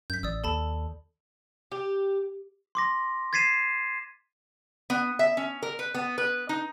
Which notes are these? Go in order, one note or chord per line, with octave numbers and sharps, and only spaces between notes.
F#2 G6 B6
A1 D5 D#6 E6
D#2 A4 A5 B5
G4
C6 D6 A#6
G#6 A6 B6 C7 D#7 E7
B3
E5
C#4
A#4
B4
B3
B4
D#4